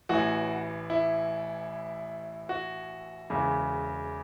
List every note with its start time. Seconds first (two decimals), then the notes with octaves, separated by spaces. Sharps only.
0.09 A1 A2 E3 F#4
0.90 E4
2.49 F#4
3.30 E1 E2 C#3